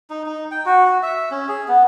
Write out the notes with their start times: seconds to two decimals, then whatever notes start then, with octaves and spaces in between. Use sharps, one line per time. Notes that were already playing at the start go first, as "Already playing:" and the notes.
0.10 D#4
0.26 D#4
0.51 G5
0.66 F#4
0.86 F#4
1.03 E5
1.31 C#4
1.48 G#4
1.68 B3